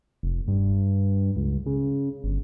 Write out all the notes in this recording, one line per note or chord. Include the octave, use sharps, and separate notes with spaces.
F1
G2
C#2
C#3
G1